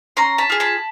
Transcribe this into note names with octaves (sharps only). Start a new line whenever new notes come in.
C#4 A#5 C6
A5 B5
F4 G#4
A5 B5